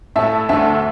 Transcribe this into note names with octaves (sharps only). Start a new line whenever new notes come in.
A2 A3 E5 A5
D2 D3 A3 E5 A5